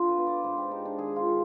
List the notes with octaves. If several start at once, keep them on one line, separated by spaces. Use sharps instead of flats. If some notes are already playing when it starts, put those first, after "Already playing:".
Already playing: D3 F4
B4
B3
D5
G#2 C5
G4
G#3 D#4
D4
D#3 G#4
F4
D#3